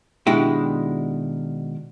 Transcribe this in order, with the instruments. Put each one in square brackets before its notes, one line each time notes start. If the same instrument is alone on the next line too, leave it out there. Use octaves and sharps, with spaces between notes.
[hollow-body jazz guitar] B2 D#3 G#3 D4 E4 G4